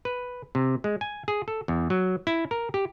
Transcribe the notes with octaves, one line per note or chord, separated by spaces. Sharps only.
B4
C3
G#3
G#5
G#4
A4
E2
F#3
E4
A#4
G4